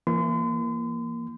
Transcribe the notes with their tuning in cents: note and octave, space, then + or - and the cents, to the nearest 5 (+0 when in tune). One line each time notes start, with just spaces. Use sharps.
E3 +35 A#3 +0 C6 -40